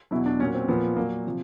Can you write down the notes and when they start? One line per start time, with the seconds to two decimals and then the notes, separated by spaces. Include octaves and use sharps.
0.11 E2 B2 F#3 E4
0.26 D4
0.39 F#3 C#4
0.43 A#2
0.55 C4
0.68 A#2 F3 B3
0.96 A#2 F#3 A#3
1.26 C3 F3